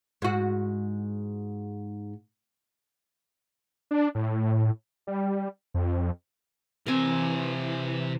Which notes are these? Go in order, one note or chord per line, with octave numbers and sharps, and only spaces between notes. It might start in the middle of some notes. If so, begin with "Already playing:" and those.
G#2 F#4
D4
A2
G3
F2
C3 E3 C4 A#4 G#5